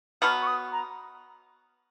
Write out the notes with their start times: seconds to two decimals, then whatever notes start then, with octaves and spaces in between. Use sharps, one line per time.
0.22 B2 F#3 B3 F6
0.42 C#6
0.47 D#6
0.72 A#5